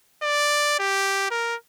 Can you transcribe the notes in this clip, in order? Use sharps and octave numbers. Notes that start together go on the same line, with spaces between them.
D5
G4
A#4